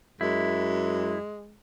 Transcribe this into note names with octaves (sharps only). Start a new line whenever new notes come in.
F#2 G#3 E4